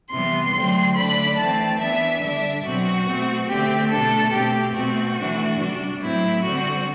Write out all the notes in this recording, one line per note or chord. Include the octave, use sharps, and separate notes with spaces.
C3 E3 G3 B3 C6
D3 F#3 A3 C4
D3 A3 D4 B5
E3 A3 C4 A5
E3 B3 D4 E5
D3 G3 D4 E5
B2 F#3 C4 F#4
B2 A3 C4
D3 A3 C4 G4
B2 A3 D4 A4
B2 A3 C4 G4
B2 A3 C4 F#4
E3 A3 D4
C3 G3 D4
A2 F#3 C4 E4
D3 G3 C4 F#4